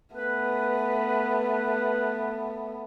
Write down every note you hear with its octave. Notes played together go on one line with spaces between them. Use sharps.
A3 B3 B4